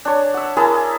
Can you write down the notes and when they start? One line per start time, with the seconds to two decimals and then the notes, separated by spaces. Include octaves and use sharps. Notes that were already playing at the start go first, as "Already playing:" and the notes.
0.05 D4 C#5
0.34 E5 F#5
0.57 E4 G#4 A#4 A5